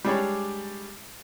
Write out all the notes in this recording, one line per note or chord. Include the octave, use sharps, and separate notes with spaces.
G3 G#3 D4 C#5